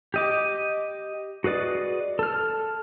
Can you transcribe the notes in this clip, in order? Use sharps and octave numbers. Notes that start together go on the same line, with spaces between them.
G4 D#5 D6
F#4 G#4 B4 D5 D#5
A4 F6